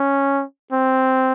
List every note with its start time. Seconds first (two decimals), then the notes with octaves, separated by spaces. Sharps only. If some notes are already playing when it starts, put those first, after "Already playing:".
Already playing: C#4
0.72 C4